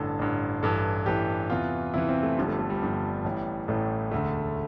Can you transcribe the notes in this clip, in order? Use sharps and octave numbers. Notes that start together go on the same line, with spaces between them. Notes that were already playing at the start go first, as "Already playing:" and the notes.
Already playing: A1 G2 D3 A4
A1 G2 D3
A1 G2 E3 A4
A1 G2 E3 G4
E2 C3 E3 F4
E2 C3 E3 E4
C4
A3
G1 G2 D3 F3 G3
A3
A3
G3
G1 G2 D3 F3
A1 A2 E3
A1 A2 E3 A3
E1 D2 D3 A3